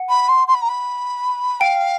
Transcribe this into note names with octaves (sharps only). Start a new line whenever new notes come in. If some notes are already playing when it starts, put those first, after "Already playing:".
Already playing: F#5
B5
C6
C6
B5
A#5
B5
F5 G5